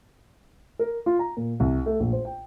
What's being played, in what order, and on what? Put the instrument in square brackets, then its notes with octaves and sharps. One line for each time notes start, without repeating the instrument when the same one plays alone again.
[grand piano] A#4
F4
A#5
A#2
C2
A3
A#1
C5
G5